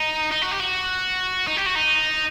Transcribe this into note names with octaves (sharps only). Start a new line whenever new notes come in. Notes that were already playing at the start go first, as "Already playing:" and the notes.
Already playing: D#4
D#4
F#4
G4
F#4
D#4
G4
F#4
D#4